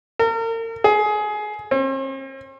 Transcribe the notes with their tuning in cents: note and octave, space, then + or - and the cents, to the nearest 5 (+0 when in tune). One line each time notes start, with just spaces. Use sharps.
A#4 -40
G#4 +20
C4 +45